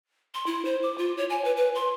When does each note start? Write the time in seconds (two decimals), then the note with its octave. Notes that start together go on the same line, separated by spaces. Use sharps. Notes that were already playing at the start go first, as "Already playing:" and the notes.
0.34 C6
0.46 E4
0.65 C5
0.83 D6
0.98 F4
1.17 C#5
1.30 G#5
1.45 B4
1.57 B4
1.75 C6